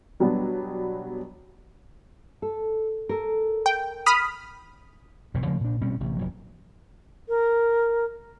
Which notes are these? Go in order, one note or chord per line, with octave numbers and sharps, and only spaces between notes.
B2 F#3 G3 B3 D4
A4
A4 A#4
G5
B5 D#6 F6
E1 B1 G2 B2
C#3 F3 A3 A#3
A#2 D4
B2 G3 C4 C#4
A1 C3
F1 A#1 F#3
A#4